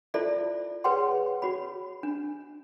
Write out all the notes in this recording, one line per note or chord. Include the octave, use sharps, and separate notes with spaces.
E4 F4 A4 C5 D5 E5
G#4 B4 C#5 F#5 G5 C6
F#4 C#5 B5
D4